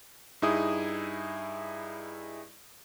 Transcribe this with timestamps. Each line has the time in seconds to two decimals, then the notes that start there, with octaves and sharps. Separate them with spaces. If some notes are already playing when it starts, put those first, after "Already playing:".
0.42 G2 D#4 E4 G#4 D#6